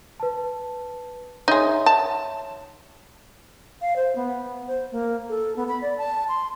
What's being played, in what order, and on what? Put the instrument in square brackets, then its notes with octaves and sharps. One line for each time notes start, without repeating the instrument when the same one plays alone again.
[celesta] B4 A5
[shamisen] D#4 G#4 [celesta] C#5 E5 C6
[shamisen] A5
[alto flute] F5
C5
B3
C5
A#3
A4
B3
B5
D5
A5
C6